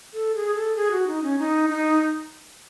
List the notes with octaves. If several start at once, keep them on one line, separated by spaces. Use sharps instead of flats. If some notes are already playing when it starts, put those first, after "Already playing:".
A4
G#4
A4
G#4
F#4
D#4
C#4
D#4
D#4